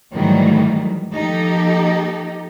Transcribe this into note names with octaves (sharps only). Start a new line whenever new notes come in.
G#2 D#3 E3 F#3 G3 A3
F3 A#3 D#4 G4 A4